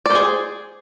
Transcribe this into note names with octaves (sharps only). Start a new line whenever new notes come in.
G#4 C5 D5